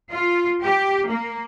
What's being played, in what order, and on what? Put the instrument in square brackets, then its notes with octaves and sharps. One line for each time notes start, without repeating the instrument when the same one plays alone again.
[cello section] F4
G4
A#3